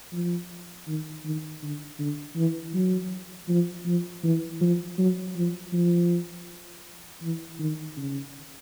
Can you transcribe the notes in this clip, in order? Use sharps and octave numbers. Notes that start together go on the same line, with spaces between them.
F3
D#3
D#3
D3
D3
E3
F#3
F3
F3
E3
F3
F#3
F3
F3
E3
D#3
C#3